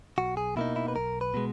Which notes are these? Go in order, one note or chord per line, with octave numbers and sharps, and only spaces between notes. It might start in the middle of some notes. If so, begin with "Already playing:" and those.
B1 F#4
G#4
B2 A#3 D#4 E4
E4
B4
B1 A#4
B4
B2 G#3